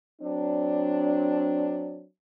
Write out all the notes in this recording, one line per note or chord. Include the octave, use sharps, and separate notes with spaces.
F#3 C4 D4